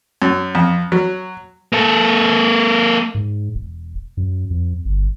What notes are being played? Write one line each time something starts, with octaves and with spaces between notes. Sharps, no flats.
F#2
F2
F#3
A#3 A4
G#2
E1
F#2
F2
G1